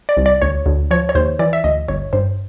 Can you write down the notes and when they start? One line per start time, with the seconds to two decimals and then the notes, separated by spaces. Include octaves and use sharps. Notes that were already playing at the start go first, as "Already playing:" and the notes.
0.09 D5
0.17 C2
0.26 D5
0.42 D2 C#5
0.66 D2
0.91 F3 C#5
1.09 C#5
1.15 D#2 C5
1.39 E3 D5
1.53 E5
1.64 D2 D#5
1.88 G1 C#5
2.13 G2 C5